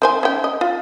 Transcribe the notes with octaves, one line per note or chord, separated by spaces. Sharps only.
D#3 C5 G#5
C#4 G5
D#5
F4